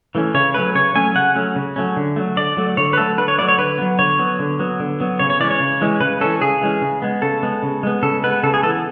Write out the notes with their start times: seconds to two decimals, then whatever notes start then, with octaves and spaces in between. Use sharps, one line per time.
0.15 E3 A3 C#4
0.34 C#3 C#5
0.54 F#3 A3 C#4 B4
0.75 C#3 C#5
0.95 F#3 A3 C#4 G#5
1.15 C#3 F#5
1.36 F#3 A3 C#4
1.56 C#3
1.76 F#3 A3 C#4
1.97 D3
2.16 F#3 A3
2.37 D3 D5
2.57 F#3 A3
2.77 D3 C#5
2.93 B4
2.97 F#3 A3 A4
3.18 D3 B4
3.28 C#5
3.38 F#3 A3 D5
3.48 C#5
3.58 D3 B4
3.78 F#3 B3
3.99 D3 C#5
4.19 F#3 B3
4.39 D3
4.59 F#3 B3
4.80 D3
5.00 F#3 B3
5.19 C#3 C#5
5.30 C#5
5.40 E3 G#3 C#4 D5
5.51 C#5
5.60 C#3
5.81 E3 G#3 C#4
6.00 C#3 B4
6.21 E3 G#3 C#4 A4
6.41 C#3 G#4
6.62 E3 G#3 C#4
6.82 C#3
7.02 G#3 B3
7.22 C#3 A4
7.43 G#3 B3
7.63 C#3
7.83 G#3 B3
8.03 C#3 A4
8.24 G#3 B3 B4
8.43 C#3 A4
8.54 G#4
8.63 E3 B3 A4